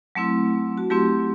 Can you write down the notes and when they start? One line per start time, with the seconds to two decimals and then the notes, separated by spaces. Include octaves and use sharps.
0.15 F#3 A3 C4 E4
0.77 F#4
0.90 F#3 A3 C4 E4 G4